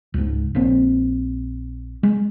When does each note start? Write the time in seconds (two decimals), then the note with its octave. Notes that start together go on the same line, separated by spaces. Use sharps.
0.14 C#2 G#2
0.55 A#1 A#3 C4 D4
2.03 G#3